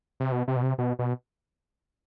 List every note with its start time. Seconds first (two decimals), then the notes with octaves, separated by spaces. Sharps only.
0.20 C3
0.32 B2
0.48 C3
0.56 B2
0.63 C3
0.78 B2
0.99 B2